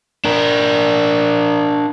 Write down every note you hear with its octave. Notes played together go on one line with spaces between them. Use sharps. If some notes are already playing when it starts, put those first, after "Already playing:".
D4 A#4